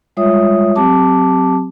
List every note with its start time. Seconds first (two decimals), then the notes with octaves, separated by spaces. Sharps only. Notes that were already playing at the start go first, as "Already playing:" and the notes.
0.17 G3 G#3 F4 C#5 E5 D#6
0.76 F#3 C4 G4 A5 D6